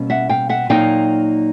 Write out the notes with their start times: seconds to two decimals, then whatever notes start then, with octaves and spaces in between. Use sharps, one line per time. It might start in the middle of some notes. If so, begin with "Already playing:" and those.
Already playing: B2 G3 A#3 C#4
0.10 E5 F#5
0.29 F5 G5
0.49 E5 F#5
0.69 A#2 F#3 A#3 D#4 F5 G5